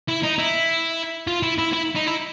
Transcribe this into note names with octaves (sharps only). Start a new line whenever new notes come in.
E4
D#4
E4
F4
E4
E4
E4
D#4
E4